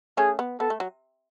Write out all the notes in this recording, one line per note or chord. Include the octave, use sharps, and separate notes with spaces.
A3 C#4 G#4
B3
B3 A4
A3
F#3